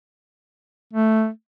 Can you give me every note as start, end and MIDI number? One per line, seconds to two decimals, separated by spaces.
0.93 1.29 57